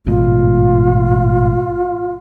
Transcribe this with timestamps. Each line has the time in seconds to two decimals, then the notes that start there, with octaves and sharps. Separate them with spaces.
0.06 A1 G#2 B2 F4